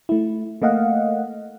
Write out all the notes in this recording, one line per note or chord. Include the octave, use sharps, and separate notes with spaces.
A3 E4
A3 A#3 D#5 F5 F#5